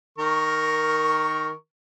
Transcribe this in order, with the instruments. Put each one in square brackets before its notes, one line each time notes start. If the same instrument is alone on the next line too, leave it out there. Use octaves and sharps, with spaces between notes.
[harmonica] D#3 A#4 C#6